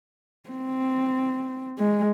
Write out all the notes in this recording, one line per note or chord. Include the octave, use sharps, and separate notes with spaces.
C4
G#3